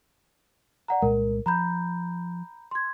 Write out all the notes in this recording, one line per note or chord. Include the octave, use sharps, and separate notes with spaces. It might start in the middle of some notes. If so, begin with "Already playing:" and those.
D5 F#5 A#5
C2 A#2 G#3 A#4
F3 A#5 B5 G6
C6 G#6